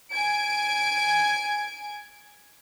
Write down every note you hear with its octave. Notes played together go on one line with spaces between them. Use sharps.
G#5 G#6 D7